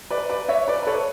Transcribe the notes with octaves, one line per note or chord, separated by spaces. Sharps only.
B4 D5
B4 D5
C#5 E5
B4 D5
B4
A4 C#5